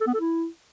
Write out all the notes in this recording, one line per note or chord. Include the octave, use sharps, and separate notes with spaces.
A4
B3
A4
E4